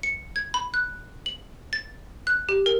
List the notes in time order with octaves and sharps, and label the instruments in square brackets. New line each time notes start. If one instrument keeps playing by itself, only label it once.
[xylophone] C#7
G#6
B5
F#6
F#7
A6
F#6
G4
A#4